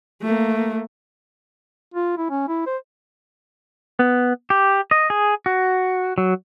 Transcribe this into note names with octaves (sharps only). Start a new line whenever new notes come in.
A3 A#3
F4
E4
C#4
E4
C5
B3
G4
D#5
G#4
F#4
F#3